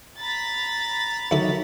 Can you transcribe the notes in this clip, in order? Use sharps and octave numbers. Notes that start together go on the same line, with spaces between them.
A#5 B5 A6
D2 D#3 F#3 E4 A4